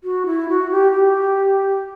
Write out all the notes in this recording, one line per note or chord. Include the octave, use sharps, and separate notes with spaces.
F#4
E4
F#4
G4
G4